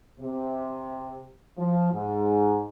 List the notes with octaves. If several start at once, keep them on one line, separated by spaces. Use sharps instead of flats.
C3
F3
G#2